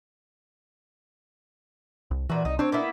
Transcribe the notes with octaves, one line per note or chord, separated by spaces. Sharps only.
C2
A#2 E3 F#4
C2 D#4
C4 D4 C#5
A#3 B3 E4